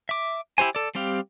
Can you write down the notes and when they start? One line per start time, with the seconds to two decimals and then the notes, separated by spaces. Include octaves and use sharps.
0.09 E5 D6
0.58 E4 G4 C5 G#5
0.75 A4 D5
0.95 G3 C4 G4 F5